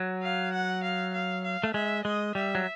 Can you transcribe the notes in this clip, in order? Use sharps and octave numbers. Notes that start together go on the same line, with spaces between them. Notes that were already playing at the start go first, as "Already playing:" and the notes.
Already playing: F#3
F5
F#5
F5
F5
F5
A3
G#3 E5
G#3 D#5
G3 E5
F#3